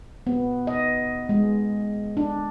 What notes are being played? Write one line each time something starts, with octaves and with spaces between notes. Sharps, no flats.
B3
D#5
G#3
D4